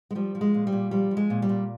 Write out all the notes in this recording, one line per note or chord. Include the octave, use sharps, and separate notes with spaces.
G#3
F3 G3
F3
G#3
A#2
G3
A#2
F3 G3
F3
G#3
A#2
G3
A#2